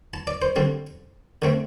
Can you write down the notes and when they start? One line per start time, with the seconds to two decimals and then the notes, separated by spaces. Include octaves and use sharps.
0.14 A5
0.27 D5
0.42 C5
0.56 D3 G3 C4
1.42 D3 A3 C4